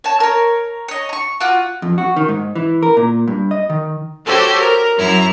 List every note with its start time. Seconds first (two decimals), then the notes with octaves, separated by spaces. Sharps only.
0.04 C#5 A5
0.20 A#4 C#5
0.88 C#5 D#5
1.09 A#5 C#6
1.40 F4 F#4 F#5 D6
1.82 F2
1.98 F#4
2.16 D#3
2.29 G#2
2.55 E3
2.83 A#4
2.97 A#2
3.27 G2
3.51 D#5
3.70 D#3
4.25 F#4 G4 A4 C5 C#5
4.60 A#4
4.96 F#2 E4 A#5